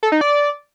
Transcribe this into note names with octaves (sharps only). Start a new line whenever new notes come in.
A4
D#4
D5